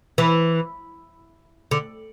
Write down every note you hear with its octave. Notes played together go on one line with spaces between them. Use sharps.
E3
D3